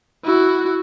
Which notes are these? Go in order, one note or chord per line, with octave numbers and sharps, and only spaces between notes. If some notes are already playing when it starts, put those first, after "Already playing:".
E4 F#4